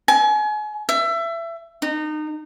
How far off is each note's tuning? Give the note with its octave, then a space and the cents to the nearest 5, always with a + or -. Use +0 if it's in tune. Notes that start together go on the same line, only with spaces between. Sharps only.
G#5 +35
E5 +25
D#4 -30